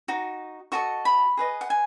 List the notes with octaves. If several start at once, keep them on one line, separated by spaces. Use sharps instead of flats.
D#4 F#4
F#4 A4 D#5 C#6
B5
G#4 B4 D#5
F#5
G#5